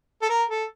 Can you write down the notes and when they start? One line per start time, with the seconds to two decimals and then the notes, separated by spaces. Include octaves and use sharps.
0.22 A4
0.30 A#4
0.50 A4